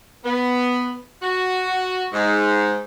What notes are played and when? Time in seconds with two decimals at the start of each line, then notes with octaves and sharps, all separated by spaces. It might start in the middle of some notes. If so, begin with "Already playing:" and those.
0.25 B3
1.22 F#4
2.13 G#2